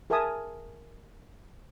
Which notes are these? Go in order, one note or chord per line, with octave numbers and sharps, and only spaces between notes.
G#4 A#4 E5 G#5 A5 D#6